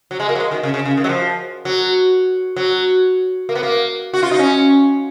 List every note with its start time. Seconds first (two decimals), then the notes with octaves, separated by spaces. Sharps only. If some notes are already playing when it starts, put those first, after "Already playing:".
0.11 F#3
0.20 G#3
0.29 A#3
0.35 F#3
0.40 G#3
0.51 D#3
0.63 C#3
0.74 C#3
0.86 C#3
0.97 D#3
1.04 F#3
1.09 F3
1.65 F#3
2.56 F#3
3.49 A#3
3.55 B3
3.63 A#3
4.14 F#4
4.23 F4
4.31 D#4
4.39 C#4